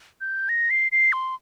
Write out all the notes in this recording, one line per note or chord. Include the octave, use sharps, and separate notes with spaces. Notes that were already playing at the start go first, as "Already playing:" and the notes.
G6
A#6
C7
C7
C6